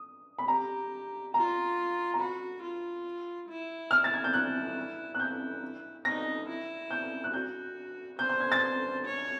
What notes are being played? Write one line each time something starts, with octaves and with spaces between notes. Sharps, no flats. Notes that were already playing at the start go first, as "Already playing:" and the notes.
Already playing: D#6
B5
G4 A#5
F4 A#5
A#5
F#4 B5
F4
E4
F6
A6
G#6
G6
E4 F#6
F#6
E4 G6
D#4 A#6
E4
G6
F#6
F#4 G6
C5 G6
G6
G#6
A6
C#5